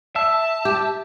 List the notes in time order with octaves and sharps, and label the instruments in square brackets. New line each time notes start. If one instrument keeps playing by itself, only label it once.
[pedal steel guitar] E5 [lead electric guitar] A5
[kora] G4